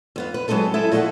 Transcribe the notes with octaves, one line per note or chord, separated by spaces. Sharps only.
F2 B3 F5
B4
F#3 G#3 C4 D#4 A4 B4
E4 G#4 A4 E5
A#2 F3 A3 D#5 E5 F#5